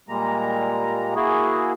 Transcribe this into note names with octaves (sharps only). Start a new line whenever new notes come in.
A#2 G3 G#3 A#3 A#5
A#3 E4 F#4 G#4